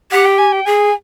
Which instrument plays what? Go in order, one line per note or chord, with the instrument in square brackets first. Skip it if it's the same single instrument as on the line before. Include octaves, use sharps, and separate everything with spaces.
[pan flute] G4 [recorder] F#5
[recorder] G5
G#5
G5
[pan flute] G#4 [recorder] G#5